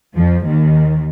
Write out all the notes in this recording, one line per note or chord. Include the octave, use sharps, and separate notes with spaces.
F2 F3
D#2 D#3